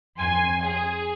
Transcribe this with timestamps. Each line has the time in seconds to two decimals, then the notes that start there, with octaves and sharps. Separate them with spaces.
0.17 F2 G#5 C6
0.67 G#4